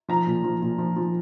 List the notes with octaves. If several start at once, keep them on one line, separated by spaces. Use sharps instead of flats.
F3 A#5
A#2
F3
A#2
F3
F3